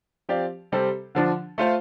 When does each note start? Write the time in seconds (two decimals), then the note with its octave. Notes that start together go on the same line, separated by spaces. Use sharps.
0.29 F3 C4 G4 D5 F5
0.72 C3 G3 C4 A4 C5
1.15 D3 F3 D4
1.58 A3 F4 C5 F5